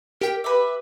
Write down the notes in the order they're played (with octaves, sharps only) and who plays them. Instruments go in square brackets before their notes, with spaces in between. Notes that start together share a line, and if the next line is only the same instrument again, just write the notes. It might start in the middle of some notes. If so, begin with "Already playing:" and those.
[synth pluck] G4 G5 B6 [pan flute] A#4
[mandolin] B4 E5 [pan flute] D6